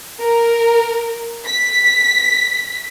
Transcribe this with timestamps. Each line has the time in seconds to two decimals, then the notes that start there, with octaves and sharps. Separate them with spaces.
0.20 A#4
1.46 B6